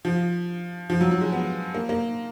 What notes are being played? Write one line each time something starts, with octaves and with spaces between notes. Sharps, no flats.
F3
F3
F#3
F#3
G#3
B3
A#3
A#3